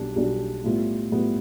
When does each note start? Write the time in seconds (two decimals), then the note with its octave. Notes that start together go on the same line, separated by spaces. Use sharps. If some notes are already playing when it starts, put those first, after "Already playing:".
Already playing: B1 B2 G3 D4
0.16 B1 B2 G3 D4
0.64 A2 G3 B3 F4
1.12 A2 G3 B3 F4